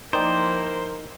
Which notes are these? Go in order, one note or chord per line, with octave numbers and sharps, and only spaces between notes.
F3 A#3 D#4 E4 A#4 C5 D5 G5